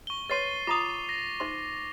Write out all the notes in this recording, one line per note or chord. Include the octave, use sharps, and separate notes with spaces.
C#6 G7
B4 C#5 C6 A6 C7 D#7
F4 A#5 D6 D#6 F7
A#6
D#4 C5 C6